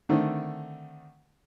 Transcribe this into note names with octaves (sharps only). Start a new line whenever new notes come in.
D3 D#3 A3 C4